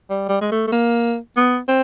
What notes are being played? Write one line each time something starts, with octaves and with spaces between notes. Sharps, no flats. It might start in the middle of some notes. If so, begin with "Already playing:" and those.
G3
G3
G#3
A3
A3
A#3
B3
C4